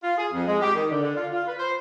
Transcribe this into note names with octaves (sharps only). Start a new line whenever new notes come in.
F4
G#4
F2
G#3
G4
D#3
D3
D3
F4
F4
B4
C5